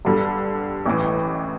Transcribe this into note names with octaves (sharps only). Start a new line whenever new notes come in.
G2 D3 G3
A1 A2 E3